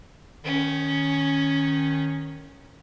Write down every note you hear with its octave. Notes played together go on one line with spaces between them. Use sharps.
D#3 C#4